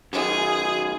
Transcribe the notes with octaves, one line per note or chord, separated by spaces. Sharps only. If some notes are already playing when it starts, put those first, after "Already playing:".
F#2 D#3 G#4